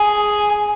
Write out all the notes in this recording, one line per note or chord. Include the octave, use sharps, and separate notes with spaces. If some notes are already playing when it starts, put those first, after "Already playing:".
Already playing: G#4